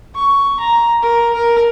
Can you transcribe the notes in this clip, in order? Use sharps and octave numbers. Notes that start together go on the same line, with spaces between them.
C#6
A#5
A#4
A#4